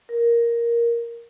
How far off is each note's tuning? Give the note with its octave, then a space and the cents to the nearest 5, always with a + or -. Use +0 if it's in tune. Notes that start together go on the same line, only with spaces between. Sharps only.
A#4 +5